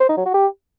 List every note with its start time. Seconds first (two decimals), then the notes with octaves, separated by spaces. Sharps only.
0.01 C5
0.09 D#4
0.17 F#3
0.26 F#4
0.34 G4